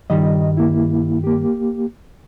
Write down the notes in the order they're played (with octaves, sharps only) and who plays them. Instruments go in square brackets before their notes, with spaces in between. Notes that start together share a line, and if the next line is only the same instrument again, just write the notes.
[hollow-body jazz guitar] G2 D#3 G3 [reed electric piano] D#5
[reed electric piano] A#3 E4
A#3 G4